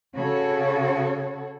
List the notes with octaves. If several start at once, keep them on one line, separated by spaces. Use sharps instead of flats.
C#3 F#4 A4 C#5